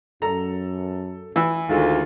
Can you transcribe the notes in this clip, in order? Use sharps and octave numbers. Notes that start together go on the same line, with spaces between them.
F#2 A4 A#5
E3 E6
D2 D#3 G#3 F4 A4